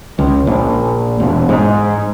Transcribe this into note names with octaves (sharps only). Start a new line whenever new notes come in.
C#2
A#1
E1
G#2